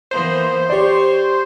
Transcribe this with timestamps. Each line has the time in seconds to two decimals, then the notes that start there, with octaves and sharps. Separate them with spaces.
0.11 E3 A#3 B3 C5
0.69 G4 C#5 D5